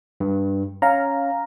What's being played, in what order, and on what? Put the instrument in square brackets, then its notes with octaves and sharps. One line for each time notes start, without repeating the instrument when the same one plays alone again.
[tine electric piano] G2
[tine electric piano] C#4 [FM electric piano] F5 A#5